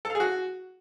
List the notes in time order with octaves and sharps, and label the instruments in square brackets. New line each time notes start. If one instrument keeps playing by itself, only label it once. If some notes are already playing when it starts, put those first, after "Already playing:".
[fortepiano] A4
F5
G#4
F#4